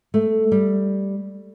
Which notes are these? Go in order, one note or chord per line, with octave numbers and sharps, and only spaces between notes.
A3
G3